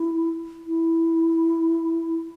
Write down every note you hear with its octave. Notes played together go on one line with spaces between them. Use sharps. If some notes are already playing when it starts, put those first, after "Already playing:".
Already playing: E4
E4